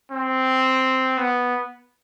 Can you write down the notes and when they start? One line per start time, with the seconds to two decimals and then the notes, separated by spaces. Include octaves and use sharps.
0.11 C4
1.18 B3